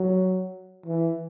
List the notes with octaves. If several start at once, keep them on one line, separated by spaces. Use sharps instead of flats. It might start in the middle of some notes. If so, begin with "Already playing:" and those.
Already playing: F#3
E3